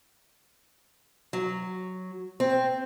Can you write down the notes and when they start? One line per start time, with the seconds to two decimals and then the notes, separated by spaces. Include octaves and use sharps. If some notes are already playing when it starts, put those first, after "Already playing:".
1.33 F#3
2.40 C4